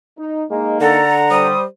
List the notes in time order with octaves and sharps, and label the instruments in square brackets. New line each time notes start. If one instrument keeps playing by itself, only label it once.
[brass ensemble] D#4
[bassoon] G#3 [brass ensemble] A#3 D#4
[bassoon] D3 [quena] A4 [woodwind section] F#5 A#5
[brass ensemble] G3 C5 [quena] D#6